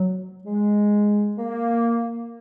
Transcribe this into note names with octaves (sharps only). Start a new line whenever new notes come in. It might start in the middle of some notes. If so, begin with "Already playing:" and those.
Already playing: F#3
G#3
A#3